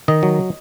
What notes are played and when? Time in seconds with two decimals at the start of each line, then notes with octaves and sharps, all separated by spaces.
0.08 D#3 D#5
0.23 F#3